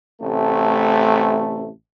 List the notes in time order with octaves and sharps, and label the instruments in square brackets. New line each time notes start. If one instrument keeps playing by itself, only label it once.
[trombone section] A1 C3 A3